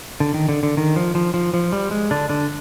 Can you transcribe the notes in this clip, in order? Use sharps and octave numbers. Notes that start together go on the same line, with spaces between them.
D3
D#3
D3
D3
D#3
F3
F3
F3
F3
G3
G#3
D3 D4
D3 D4